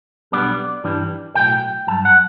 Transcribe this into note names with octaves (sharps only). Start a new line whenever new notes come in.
B1 B2 G3 B3 D4 D5
G2 E3 G3 D4
B1 A2 F#3 G5
G2 F#3 A5
F#5